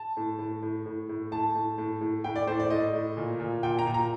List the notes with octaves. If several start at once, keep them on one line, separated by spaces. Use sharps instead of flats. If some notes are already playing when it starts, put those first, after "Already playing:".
Already playing: A5
A2
A2
A2
A2
A2
A2 A5
A2
A2
A2
A2 G5
D5
A2 C5
D5
A2 D#5
A2
A#2
A#2
A#2 G5
A#5
A#2
A#5